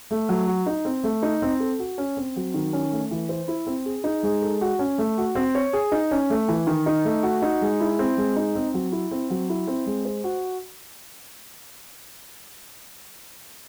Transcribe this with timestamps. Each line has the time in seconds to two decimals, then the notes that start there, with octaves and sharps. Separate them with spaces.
0.11 A3
0.29 F#3
0.48 F#4
0.66 D#4
0.85 C4
1.04 A3
1.23 D#4
1.42 C4
1.60 A4
1.79 F#4
1.98 C#4
2.17 C4
2.36 F#3
2.54 D#3
2.73 C#4
2.92 A3
3.11 E3
3.29 C5
3.48 E4
3.67 C4
3.86 G#4
4.04 D#4
4.23 G#3
4.42 A4
4.61 F#4
4.79 C#4
4.98 A3
5.18 F#4
5.35 C4
5.55 C#5
5.73 G#4
5.92 D#4
6.11 C#4
6.30 A3
6.48 E3
6.67 D#3
6.86 D#4
7.05 A3
7.23 F#4
7.42 D#4
7.61 G#3
7.80 E4
7.99 C4
8.17 G#3
8.36 D#4
8.55 C4
8.74 F#3
8.92 E4
9.11 C4
9.30 F#3
9.49 E4
9.67 C4
9.86 G#3
10.05 C5
10.24 F#4